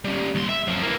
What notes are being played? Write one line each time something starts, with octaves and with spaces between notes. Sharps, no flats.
G3 C#4
D#2 C6
E5
F#2 F3
E3 A#3